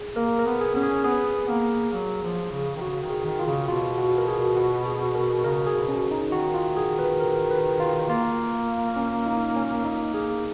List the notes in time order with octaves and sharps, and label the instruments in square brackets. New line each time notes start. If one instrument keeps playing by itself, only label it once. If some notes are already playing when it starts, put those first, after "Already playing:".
Already playing: [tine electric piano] G#4
[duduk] A#3 [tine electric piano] A#4
[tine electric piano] A#4
[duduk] B3
[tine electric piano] G#4
[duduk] C#4
[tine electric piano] G#4
[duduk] B3 [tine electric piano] G#4
[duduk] A#3
F#3
F3
C#3
D#3
[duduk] C#3 [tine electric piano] F#4
[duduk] D#3
[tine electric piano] G#4
[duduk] D#3
[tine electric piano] F4
[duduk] C#3
[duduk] B2 [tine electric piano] F4
[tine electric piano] F#4
A#4
G#4
F#4
G#4
A#4
[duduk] C#3 [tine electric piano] A#4
[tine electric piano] G#4
[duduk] B2
[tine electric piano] C#4
D#4
[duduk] D#3 [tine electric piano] F#4
[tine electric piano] F4
G#4
B4
A#4
B4
F4
[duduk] A#3 [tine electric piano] F4
[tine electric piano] C#4
D#4
C#4
[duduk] A#3 [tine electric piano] D#4
[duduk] A#3 [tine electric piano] G#4